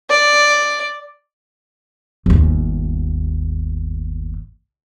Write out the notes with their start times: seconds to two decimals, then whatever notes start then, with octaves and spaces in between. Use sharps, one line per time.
0.10 D5
2.26 G1 D#2